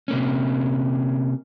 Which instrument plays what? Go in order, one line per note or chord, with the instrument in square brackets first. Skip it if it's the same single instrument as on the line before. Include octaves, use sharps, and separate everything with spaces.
[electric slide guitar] C3 A#3 C#4